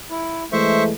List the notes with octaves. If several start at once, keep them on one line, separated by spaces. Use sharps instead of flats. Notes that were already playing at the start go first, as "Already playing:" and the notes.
E4
E3 G#3 A3 C5 E5 C#6